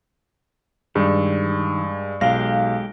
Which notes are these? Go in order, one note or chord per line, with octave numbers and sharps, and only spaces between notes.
G2 D#3 G#3
B1 G#3 G4 F5 A#6